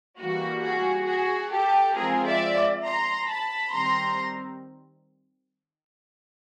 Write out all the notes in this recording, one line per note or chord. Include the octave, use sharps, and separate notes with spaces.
E3 G3 A#3 F#4
F#4 G#4
F#4 G#4
G4 A4
F3 G#3 C4 F4 G#4 A#4
D5 E5
A#5 C6
A5 B5
D#3 G3 C4 A#5 C6